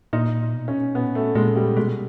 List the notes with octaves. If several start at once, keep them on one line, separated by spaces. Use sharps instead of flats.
A#2 D#4
B2
C#4
A#2 B3
A3
A#2 G#3
G3
B2 G#3